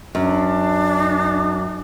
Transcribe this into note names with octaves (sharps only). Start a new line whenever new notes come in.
F#2 D4